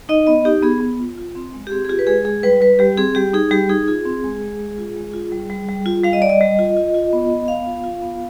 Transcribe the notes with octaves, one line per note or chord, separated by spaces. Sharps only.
D#4 D#5
B3 D#5
D#4 G4
B3 G#4
B3
F4
F4
C4
G#3
G4
C4 G#4
G#4
F4 G4
B4
G#3 G#4
G#3 G#4
G3 B4
G3 B4
G3 G4
C4 G#4
G3 G4
D#4 G#4
G3 G4
D#4 G#4
F4 G#4
C4
G#3
G#3
G#3
F4
G#3
F4
G3
G3
G3
F4
G3 F5
D#5
G3 D5
D#5
G3
F4
F4
F4
B3
B3
B3 F5
F4
F4
B3